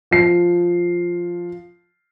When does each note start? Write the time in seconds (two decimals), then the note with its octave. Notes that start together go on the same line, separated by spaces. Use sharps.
0.11 F3 C7